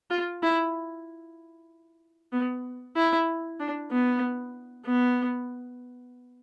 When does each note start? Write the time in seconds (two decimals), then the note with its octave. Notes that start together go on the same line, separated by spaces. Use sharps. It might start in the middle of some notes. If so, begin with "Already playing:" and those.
0.10 F4
0.43 E4
2.32 B3
2.96 E4
3.60 D4
3.91 B3
4.86 B3